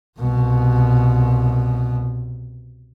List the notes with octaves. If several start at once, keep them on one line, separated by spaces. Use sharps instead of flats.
C2 B2